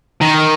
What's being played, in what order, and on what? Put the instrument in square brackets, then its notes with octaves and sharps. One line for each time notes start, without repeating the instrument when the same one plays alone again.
[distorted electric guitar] D#3